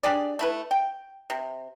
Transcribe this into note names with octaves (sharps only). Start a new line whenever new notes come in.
D4 G4 G#4 D5
A3 E4 B4
G5
C3